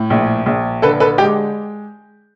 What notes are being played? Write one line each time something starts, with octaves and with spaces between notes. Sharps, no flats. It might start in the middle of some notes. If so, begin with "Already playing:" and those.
Already playing: A2
A#1
A#1
D3 A4 B4
A4 B4
G#3 G4